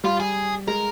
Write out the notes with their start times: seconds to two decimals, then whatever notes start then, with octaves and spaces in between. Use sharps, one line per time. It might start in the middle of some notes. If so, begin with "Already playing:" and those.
0.04 G3 F4
0.20 G#4
0.67 G#3 A#4